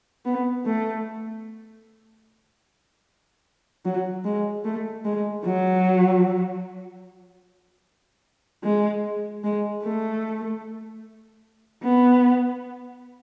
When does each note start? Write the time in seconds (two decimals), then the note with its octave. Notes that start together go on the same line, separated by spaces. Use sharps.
0.25 B3
0.66 A3
3.85 F#3
4.24 G#3
4.65 A3
5.05 G#3
5.45 F#3
8.63 G#3
9.44 G#3
9.84 A3
11.83 B3